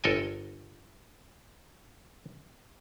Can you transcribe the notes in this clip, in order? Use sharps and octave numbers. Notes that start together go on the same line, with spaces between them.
G1 A4 A#4 D#5 G#5